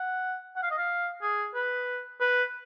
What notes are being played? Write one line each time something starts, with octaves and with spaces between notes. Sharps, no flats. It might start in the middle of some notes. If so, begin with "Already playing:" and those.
Already playing: F#5
F#5
F5
D#5
F5
G#4
B4
B4